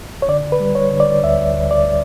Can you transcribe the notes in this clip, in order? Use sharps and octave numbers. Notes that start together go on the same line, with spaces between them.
C#5
D3 D5
B4
G3
C#5
D3
D5
D2 E5
D2
D5